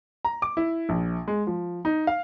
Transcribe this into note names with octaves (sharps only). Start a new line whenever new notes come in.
A#5
D6
E4
A#1
G#3
F3
D#4
F5